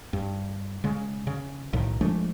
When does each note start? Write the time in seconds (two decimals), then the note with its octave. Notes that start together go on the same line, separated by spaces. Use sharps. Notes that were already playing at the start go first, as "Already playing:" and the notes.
0.13 G2
0.84 C#3 G#3
1.27 C#3
1.73 B1 A2 D#3
2.01 F3 G#3 A3 D4